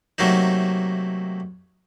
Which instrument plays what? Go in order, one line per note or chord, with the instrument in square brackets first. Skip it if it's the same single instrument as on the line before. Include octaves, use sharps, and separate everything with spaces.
[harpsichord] C3 F#3 A3 A#3 D#4